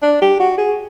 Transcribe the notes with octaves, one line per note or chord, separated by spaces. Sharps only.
D4
G4
F#4
G#4